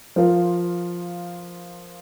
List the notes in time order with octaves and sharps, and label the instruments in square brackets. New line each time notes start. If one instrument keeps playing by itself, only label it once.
[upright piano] F3 F4 A#4 F5